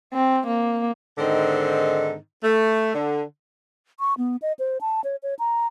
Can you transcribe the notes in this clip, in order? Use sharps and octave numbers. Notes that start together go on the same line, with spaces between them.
C4
A#3
G#2 D3 D#3 C4 D#4
A3
D3
C#6
B3
D#5
C5
A5
C#5
C#5
A#5